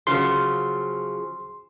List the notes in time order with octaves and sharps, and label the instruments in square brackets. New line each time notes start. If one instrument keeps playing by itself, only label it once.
[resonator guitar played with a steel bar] C#3 F3 F#3 [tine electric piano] C6